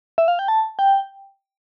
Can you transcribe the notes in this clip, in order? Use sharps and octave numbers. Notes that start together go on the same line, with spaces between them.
E5
F5
G5
A5
G5